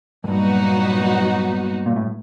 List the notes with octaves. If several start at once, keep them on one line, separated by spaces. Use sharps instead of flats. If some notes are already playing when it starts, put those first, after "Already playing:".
F#2
G2 A#2 F#3 B3 D#4 F#4
A#2
A2